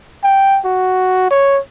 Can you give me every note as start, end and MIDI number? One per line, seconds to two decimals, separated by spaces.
0.24 0.59 79
0.65 1.30 66
1.31 1.59 73